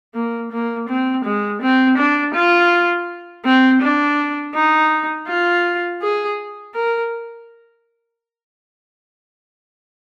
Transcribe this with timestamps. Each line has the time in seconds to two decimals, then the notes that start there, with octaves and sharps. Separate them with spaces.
0.14 A#3
0.52 A#3
0.89 C4
1.25 G#3
1.61 C4
1.98 D4
2.35 F4
3.45 C4
3.82 D4
4.54 D#4
5.28 F4
6.02 G#4
6.74 A#4